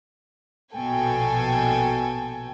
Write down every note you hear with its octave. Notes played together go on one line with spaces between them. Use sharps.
A#1 B2 A4 G5 G#5